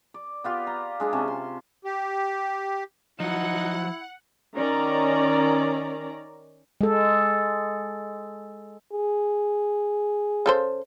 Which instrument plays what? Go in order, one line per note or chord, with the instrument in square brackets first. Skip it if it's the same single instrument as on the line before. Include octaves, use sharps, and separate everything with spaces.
[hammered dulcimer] D5
B3 F4 G4 D5
A#5
G#3 D4 G#4
C3 C#4 A5
C6
[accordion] G4
[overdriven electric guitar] F3 F#3 [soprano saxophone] D#4 [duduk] E4 [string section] F#5
[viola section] D#3 C#4 D5 A#5
[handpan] G#3 A4
[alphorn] G#4
[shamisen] C#3 A4 C5